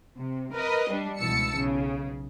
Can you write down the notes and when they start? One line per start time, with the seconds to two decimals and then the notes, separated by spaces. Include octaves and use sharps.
0.18 C3
0.53 A#4 B4 D#5
0.89 G3 D4
1.19 C#2 B2 E3 A5 E6 C#7
1.54 B1 C#3